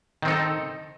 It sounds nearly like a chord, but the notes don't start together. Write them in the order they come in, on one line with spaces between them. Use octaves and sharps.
D#3 C4 D#4 A4